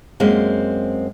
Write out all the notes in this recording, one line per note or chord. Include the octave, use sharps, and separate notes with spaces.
F#2 G#3 A#3 C4